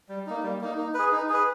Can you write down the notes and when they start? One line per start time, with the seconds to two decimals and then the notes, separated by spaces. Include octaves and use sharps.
0.09 G3
0.26 A#3 D#4
0.43 G3
0.61 A#3 D#4
0.78 D#4
0.94 G#4 B4
1.12 D#4
1.29 G#4 B4